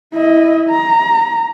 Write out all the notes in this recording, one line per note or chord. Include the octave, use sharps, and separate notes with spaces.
E4 D#5
A#5